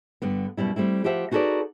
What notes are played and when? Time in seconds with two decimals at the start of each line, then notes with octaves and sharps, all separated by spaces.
0.22 G2 D3 B3
0.57 F#2 B2 G3 E4
0.76 G3 A3 C4 E4
1.04 F3 G4 C5 E5 F#5
1.31 D#4 F#4 G#4 A4 B4 D5